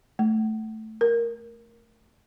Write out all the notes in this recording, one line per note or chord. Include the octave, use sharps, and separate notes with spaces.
A3
A#4